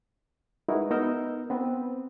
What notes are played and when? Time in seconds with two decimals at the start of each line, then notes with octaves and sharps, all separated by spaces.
0.68 G#3 D#4 E4 F#4 A#4 B4
0.91 B3 D#4 A#4 A#5 E6 G6
1.50 B3 C4 B4